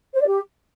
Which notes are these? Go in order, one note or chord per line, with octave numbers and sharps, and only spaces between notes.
C5
D5
G4